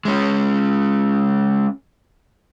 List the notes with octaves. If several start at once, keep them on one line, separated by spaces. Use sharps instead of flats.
G#3 C#4